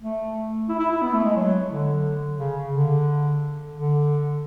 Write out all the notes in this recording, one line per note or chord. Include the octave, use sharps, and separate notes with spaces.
A3
E4
E4
E4
B3
A3
G#3
F#3
D3
C#3
D3
D3